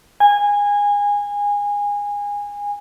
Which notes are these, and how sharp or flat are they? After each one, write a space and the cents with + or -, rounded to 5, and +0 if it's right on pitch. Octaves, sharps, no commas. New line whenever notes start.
G#5 -20